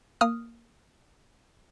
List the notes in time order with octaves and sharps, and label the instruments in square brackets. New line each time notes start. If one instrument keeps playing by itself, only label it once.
[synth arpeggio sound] A#3 D#6 F6